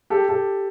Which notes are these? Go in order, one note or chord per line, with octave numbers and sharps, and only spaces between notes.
G4 A4
G4 A4